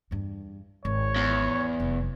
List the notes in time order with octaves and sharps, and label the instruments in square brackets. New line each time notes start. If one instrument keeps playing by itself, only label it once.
[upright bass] E2 G2
[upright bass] G#1 [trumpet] C#5
[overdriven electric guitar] E2
[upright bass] F1 F#2